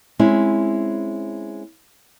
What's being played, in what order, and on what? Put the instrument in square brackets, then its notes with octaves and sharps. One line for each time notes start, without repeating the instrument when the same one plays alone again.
[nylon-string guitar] G#3 C4 C#4 E4